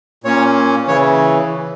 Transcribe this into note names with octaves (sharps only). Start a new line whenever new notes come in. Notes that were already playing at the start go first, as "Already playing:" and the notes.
A#2 A#3 C#4 C#5
C#3 E3 C#5